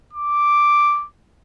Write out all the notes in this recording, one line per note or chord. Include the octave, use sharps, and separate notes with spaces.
D6